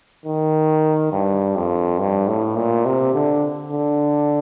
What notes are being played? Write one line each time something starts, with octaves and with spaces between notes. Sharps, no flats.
D#3
G2
F2
G2
A2
A#2
C3
D3
D3